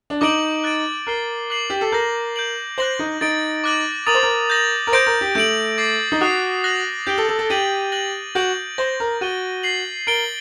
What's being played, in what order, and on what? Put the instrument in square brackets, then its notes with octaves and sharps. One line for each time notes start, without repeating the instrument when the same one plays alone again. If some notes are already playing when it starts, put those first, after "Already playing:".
[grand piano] D4
[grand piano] D#4 [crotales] D6 G6 D7 F#7
[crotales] F#6 A6 D7
[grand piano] A#4 [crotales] F#6 C7 G7
[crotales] D6 F#6 C7 F#7
[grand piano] G4
A4
[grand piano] A#4 [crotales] G6 A#6 F#7
[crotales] G6 D7 F#7
[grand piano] C5 [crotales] F#6 A#6 F#7
[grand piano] D#4
[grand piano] D#4 [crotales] A6 D7 F#7
[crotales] D6 F#6 A#6 F#7
[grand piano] A#4 [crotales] D#6 A6 D#7 F#7
[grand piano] C5
A#4
[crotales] G6 A#6 F#7
[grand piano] A#4
[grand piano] C5 [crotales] G6 A#6 D7
[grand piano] A#4
G4
[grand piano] A3 [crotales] G6 D7 F#7
[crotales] D6 A6 C7
[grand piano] D#4
[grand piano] F#4 [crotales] D#6 F#6 C7
[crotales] F#6 A#6 F#7
[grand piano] G4 [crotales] G6 D7 G7
[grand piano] A4
A4
A4
[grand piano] G4 [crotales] A6 D#7 F#7
[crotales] F#6 A#6 F#7
[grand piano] F#4 [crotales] G6 A#6 D7 F#7
[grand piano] C5 [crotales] G6 A#6 F#7
[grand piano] A#4
[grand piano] F#4 [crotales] A6 D#7 G7
[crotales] A6 C7 F#7
[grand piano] A#4 [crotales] A6 D7 G7